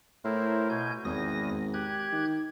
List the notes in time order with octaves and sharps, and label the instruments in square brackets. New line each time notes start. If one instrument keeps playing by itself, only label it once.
[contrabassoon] A2 [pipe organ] E4 A#4 C5
[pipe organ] B2 G#5 G6
[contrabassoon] G#1 [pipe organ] E2 D#6 A#6
[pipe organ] G4 F#6 G#6
[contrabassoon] D#3